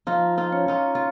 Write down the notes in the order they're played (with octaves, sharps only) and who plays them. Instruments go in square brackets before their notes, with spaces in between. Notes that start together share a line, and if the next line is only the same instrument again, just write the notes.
[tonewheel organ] F3 [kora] D#4 F4
[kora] D#4 F4
[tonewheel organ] C#4
[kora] D#4 F4
F4